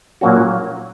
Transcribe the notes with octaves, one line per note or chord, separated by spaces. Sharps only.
A#2 F#3 A#3 C#4 F#4